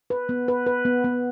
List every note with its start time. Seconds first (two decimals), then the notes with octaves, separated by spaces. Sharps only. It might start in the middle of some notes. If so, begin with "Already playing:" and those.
0.10 B4
0.29 B3
0.48 B4
0.66 B4
0.85 B3
1.04 B3